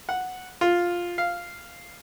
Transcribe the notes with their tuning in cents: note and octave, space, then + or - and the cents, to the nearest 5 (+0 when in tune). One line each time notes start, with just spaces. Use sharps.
F#5 -5
F4 +5
F5 -5